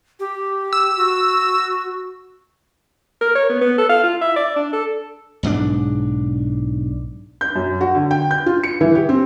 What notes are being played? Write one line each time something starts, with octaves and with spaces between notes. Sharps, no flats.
G4
E6
F#4
A#4
C#5
B3
B3
A4
F5
F4
E5
D5
D4
A4
B1 G#2 F#3 D4
G6
F#2
F#4
D3
G5
G6
F4
C#7
E3
G4
C4